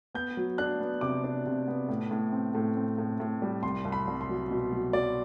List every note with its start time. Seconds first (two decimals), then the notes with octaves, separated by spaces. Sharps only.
0.14 B3 G6
0.37 F#3
0.58 D4 F#6
0.80 B3
1.01 C3 D6
1.24 D4
1.46 C3
1.68 B3
1.89 A2
2.11 A2
2.32 C4
2.55 A2
2.77 C4
2.99 A2
3.20 A2
3.42 G3
3.63 C2 C6
3.85 C2
3.92 B5
4.07 C2
4.21 C6
4.29 F#3
4.51 B2
4.72 F#3
4.93 F#3 D5